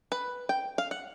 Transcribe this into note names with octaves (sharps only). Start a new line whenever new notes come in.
B4
G5
F5
F#5